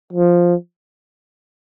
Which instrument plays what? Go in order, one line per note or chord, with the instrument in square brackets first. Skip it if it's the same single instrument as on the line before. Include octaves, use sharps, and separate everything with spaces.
[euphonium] F3